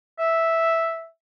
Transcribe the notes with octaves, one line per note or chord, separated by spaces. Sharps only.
E5